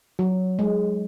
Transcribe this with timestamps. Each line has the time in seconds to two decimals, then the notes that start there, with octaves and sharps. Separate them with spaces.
0.19 F#3
0.59 G#3